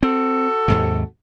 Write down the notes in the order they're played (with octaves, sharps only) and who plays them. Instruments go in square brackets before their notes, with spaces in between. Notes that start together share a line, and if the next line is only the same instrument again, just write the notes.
[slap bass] C4 [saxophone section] F#4 A4
[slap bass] D#2 G#2 C3